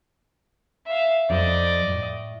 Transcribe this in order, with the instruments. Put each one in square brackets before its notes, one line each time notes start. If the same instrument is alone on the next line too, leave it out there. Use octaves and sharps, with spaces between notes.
[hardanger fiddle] E5 F5
[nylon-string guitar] F2 F3 [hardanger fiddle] D5 D#5
[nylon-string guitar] A2